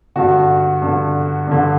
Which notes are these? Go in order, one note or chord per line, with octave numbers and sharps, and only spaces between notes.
G2 D3 F#4
G2 D3
G2 D3